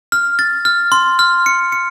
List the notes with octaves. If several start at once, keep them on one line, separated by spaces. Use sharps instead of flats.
F6
A6
F6
C6
F6
C#7
C#7